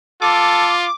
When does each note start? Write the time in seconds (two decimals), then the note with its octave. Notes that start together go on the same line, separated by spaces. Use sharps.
0.22 F4 A4 D6